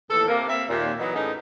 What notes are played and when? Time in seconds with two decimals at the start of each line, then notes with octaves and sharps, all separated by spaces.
0.10 D#2 A2 E3 A4
0.27 C3 A#3
0.49 A#3 C4 E5
0.69 D#2 A#2
0.99 E3 F#3 B3 D#4
1.15 A2 C#4 D#4 G#4 D#5